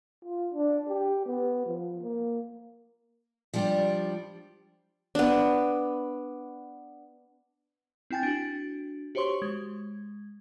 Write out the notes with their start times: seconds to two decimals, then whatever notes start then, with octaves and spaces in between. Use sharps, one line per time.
0.25 F4
0.54 D4
0.88 G4
1.26 B3
1.67 F3
2.01 A#3
3.54 F3 G3 D4 G4
5.15 B3 D4
8.11 C4 E4 G5 G#5 A6
8.23 D4 F#4
9.15 F#4 G4 C5 C#5 C6 C#6
9.42 G#3 G#6